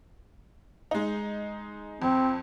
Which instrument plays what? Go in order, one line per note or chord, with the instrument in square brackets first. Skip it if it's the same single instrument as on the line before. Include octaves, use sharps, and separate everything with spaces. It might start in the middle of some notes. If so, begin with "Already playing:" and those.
[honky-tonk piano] G#3 D#4
[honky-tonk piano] F2 [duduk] C4